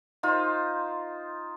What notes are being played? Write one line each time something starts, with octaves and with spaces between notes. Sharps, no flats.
D#4 F4 C5